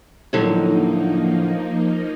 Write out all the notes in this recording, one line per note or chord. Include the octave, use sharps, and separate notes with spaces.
A2 D3 F3 F#3 A#3 D#4